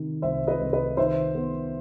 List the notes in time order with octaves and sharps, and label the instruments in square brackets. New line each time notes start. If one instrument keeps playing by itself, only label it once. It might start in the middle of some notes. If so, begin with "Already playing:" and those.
Already playing: [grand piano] C3 D#3
C2 C5 E5
B4 D#5
C2
B4 D#5
D#3 C5 E5
B3